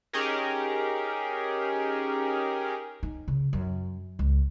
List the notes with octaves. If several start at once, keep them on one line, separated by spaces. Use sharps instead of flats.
C#4 D#4 G4 G#4 A#4
D#4
C#3
F#2
C#2